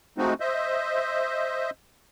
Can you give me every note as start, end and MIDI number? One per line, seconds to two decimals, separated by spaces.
0.18 0.34 53
0.18 0.34 56
0.18 0.34 57
0.18 0.34 60
0.18 0.34 63
0.18 0.34 66
0.40 1.70 72
0.40 1.70 75
0.40 1.70 76